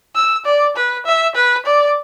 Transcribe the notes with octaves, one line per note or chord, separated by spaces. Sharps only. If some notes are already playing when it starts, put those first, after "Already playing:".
E6
D5
B4
E5
B4
D5